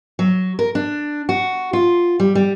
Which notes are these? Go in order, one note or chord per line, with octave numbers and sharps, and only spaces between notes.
F#3
A#4
D4
F#4
F4
G3
G3